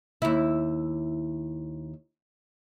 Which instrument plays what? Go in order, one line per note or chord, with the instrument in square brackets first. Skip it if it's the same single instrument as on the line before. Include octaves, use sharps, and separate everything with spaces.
[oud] D#2 E4